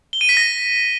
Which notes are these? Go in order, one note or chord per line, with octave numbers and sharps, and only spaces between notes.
G7
D#7
B6
A#6